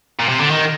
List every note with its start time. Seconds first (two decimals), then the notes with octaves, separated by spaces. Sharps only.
0.19 A#2
0.29 C3
0.39 D3
0.50 D#3